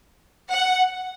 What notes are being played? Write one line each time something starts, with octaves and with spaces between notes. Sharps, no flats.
F#5